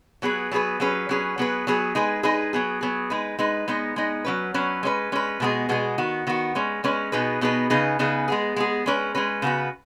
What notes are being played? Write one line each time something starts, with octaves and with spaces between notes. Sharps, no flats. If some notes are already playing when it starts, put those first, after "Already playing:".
F#3 B3 G#4 B4
F#3 B3 G#4 B4
F#3 C#4 G#4 B4
F#3 C#4 G#4 B4
F#3 B3 G#4 B4
F#3 B3 G#4 B4
G#3 D#4 G#4 B4
G#3 D#4 G#4 B4
F#3 B3 G#4
F#3 B3 G#4
G#3 D#4 B4
G#3 D#4 B4
G#3 B3 D#4
G#3 B3 D#4
F#3 C#4 B4
F#3 C#4 B4
G#3 C#4 B4
G#3 C#4 B4
B2 G#3 B3 G#4
B2 G#3 B3 G#4
D#3 B3 F#4
D#3 B3 F#4
G#3 C#4 B4
G#3 C#4 B4
B2 B3 D#4 G#4 B4
B2 B3 D#4 G#4 B4
C#3 B3 D#4 G#4 B4
C#3 B3 D#4 G#4 B4
G#3 B3 G#4
G#3 B3 G#4
G#3 C#4 B4
G#3 C#4 B4
C#3 B3 F#4 B4